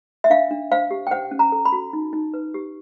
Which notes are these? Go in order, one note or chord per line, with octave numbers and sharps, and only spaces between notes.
E5
D4 F5
D4
C5 F5
G4
G5
C5 F#5
C#4
A#5
A4
B5
F#4
D#4
D#4
B4
G4